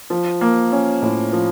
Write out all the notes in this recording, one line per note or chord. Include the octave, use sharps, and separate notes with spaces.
F3
A#3
C#4
A2
F3